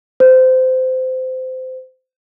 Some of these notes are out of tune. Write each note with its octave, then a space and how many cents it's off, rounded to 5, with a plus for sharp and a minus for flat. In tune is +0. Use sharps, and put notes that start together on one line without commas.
C5 -20